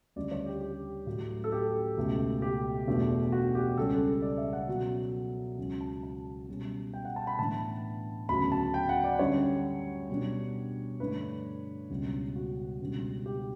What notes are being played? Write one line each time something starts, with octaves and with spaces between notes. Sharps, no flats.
D2 C#3 G3 D4 D5
C#5
G4
G4
A2 F#3 A3
A4
G4
C#2 B2 A3
G4
E2 B2 A3 D4
F#4
G4
C#2 C#3 G3 C#4 A4
D5
E5
F#5
B2 F#3 C#4
C#2 C#3 F#3 C#4
A5
A5
B2 G3 C#4
G5
F#5
A5
B5
A2 E3 B3 D4 A5
D2 C#3 F#3 B3 B5
A5
G5
F#5
D5
F#2 D3 G3 C#5
B2 G3 D4
G2 D3 A3 D4 B4
C#2 B2 G3
F#4
C#2 B2 G3 D4
G4